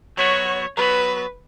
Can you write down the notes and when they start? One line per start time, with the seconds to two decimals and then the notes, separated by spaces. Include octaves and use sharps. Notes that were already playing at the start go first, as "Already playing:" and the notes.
0.17 F#3 B3 F#4 C#5
0.77 F#3 B3 F#4 B4